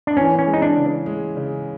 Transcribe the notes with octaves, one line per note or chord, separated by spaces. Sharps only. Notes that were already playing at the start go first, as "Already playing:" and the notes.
D4
E3 C#4
C#4
G#3
D#4
D4
C#3
G#3
C#3